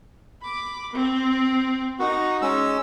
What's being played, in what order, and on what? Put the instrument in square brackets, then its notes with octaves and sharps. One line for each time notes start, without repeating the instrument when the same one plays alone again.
[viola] B5 D6
C4
[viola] D#4 [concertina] F#4
[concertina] G#3 C#4 E6